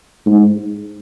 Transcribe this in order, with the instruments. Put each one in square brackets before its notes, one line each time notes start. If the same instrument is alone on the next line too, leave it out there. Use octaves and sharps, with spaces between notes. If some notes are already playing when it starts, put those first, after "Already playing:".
[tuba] G#2